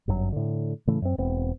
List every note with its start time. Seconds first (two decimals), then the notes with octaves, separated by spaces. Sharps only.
0.08 G1 F#2 A#2 F#3
0.32 A2 D3
0.87 A2 C#3 E3 A3
1.02 F#2 C4
1.18 E1 B3 C4